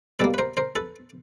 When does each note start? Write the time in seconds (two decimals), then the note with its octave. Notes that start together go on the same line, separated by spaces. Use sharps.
0.19 B2 G3 A#3 A4 B4
0.34 B4
0.38 A#4 C5
0.57 A#4 C5
0.76 A4 B4